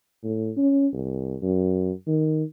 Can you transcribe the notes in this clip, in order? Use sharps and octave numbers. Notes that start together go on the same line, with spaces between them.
A2
C#4
C2
F#2
D#3